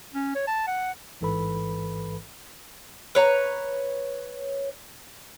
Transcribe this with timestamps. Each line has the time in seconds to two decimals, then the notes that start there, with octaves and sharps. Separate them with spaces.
0.14 C#4
0.35 C#5
0.48 A5
0.68 F#5
1.21 A1 G#2 E3 A4 B4 B5
3.15 B4 C#5 A#5